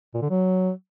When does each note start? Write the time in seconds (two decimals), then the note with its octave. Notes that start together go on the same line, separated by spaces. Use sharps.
0.14 A#2
0.22 D3
0.30 F#3